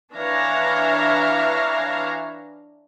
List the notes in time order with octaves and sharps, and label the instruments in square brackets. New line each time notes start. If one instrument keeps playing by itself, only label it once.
[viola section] E3 D4 C#5 E5 F5 A#5